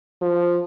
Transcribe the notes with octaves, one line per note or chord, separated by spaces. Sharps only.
F3